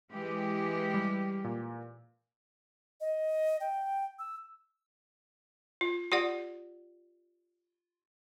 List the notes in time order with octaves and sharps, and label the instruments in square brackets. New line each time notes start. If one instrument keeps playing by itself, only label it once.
[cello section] E3 G#3 G4
[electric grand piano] G3
A#2
[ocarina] D#5
G5
E6
[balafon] F4
F4 G4 D5 F#5